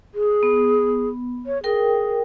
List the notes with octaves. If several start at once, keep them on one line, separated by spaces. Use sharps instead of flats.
G#4
B3
C#5
G#4 A#4 G5